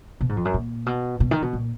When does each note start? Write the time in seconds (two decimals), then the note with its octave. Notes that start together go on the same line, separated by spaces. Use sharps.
0.21 B2
0.29 G#2
0.36 F2
0.45 F#2
0.54 A#2
0.86 B2
1.20 B2
1.31 D#3
1.42 B2
1.53 A#2